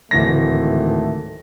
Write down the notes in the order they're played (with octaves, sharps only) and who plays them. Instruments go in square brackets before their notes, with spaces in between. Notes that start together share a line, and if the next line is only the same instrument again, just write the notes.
[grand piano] D1 E3 A#6 [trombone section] G#2 D#3 A3